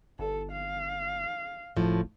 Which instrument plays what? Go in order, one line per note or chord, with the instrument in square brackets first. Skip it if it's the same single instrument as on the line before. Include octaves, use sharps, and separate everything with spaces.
[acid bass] G1 [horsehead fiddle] A4
[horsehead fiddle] F5
[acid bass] F#1 [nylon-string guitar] A2 F3